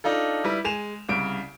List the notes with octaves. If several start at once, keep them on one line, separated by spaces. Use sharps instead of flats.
D4 D#4 F4 A4
G3 E4 B4
G#3 G#5 E7 F7
C2 C#3 D7